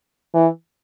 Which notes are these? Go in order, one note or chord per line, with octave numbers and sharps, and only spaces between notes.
E3